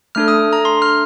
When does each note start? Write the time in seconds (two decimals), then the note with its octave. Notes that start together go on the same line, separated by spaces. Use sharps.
0.15 A3 D4 A4 F6
0.28 D#6
0.53 A#5
0.65 C6
0.82 F6